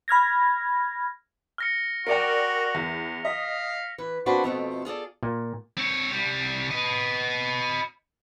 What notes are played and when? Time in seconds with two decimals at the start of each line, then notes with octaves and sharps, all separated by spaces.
0.08 B5 F6 G#6 A#6
1.58 F6 A#6 C#7
2.07 F#4 A#4 D5 G5 C#7 F7
2.75 E2
3.25 D#5 F5 B6
3.98 E3 B4
4.26 A#3 C4 D4 F#4 B4
4.44 F2 B2 A3 C4 F4
4.85 F4 G#4 A4 D5
5.23 A#2
5.77 C4 C#5
6.12 C2 G3
6.71 B4 D#5